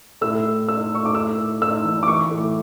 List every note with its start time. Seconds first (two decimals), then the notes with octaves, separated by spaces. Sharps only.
0.21 A2 E6
0.46 A2
0.68 A2 E6
0.91 A2 C#6
1.05 D6
1.15 A2 E6
1.38 A2
1.62 A2 E6
1.84 E3
2.03 D6
2.08 E3 C#6
2.31 A2